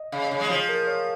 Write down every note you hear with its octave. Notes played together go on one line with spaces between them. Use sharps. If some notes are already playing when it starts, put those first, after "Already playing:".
Already playing: D#5
C#3 F5
D#5
C#3 C#5
G#3
F3 G#4
A#4
C#5